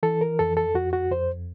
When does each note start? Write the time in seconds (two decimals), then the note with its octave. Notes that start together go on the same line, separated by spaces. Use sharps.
0.03 E3 A4
0.21 A#4
0.39 F2 A4
0.57 A4
0.75 F2 F#4
0.93 F#4
1.11 F2 C5